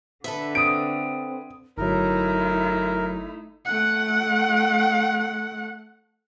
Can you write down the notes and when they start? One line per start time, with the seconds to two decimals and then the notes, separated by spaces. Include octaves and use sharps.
0.24 D3 A4 B4 E5
0.55 C4 D#6 D7
1.78 G1 F#3 A3 D#4 E4 A#4
3.65 A3 F#5